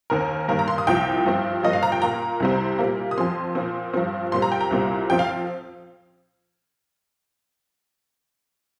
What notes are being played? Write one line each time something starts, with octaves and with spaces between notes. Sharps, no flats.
D#2 D#3 C4 A#4
G2 D#3 A#3 A#4
A#5
C6
D#6
C2 A#2 F3 G5
G2 F3 C4
G2 F3 A#3 D#5
F5
A#5
G5
A#2 A#3 A#5
C2 C3 G3 C4
A#2 G3 A#3
D#6
F2 F3 C4 C6
A#2 F3 C4
G2 F3 C4
A#2 G3 C4 C6
A#5
G5
A#5
C2 A#2 G3 C4
F2 F3 C4 G5
F5